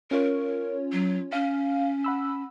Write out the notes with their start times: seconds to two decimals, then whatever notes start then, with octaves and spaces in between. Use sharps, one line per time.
0.11 C#4 F4 A#4 C#5
0.92 F#3
1.33 C#4 F5
2.04 F#5 B5 E6